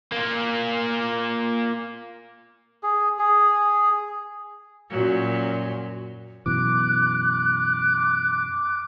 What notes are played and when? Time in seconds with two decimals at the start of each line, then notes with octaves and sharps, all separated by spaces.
0.12 A#3 F4
2.83 G#4
3.19 G#4
4.90 F#2 A#2 F#3
6.46 F#2 B2 E3 D6 F#6